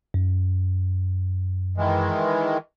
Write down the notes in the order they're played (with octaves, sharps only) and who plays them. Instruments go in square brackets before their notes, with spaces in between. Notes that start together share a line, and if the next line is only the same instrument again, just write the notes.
[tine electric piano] F#2
[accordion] D#3 E3 G#3